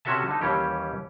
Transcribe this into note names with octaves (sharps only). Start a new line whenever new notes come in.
C3 C#4 F#4 A4 E5 A5
D3 D#4
D#2 E3 G3 C#4 G4